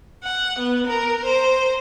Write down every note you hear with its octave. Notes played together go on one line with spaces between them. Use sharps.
F#5
B3
A#4
C5